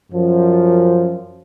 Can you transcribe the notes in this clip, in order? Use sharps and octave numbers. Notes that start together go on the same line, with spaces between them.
F#2 F3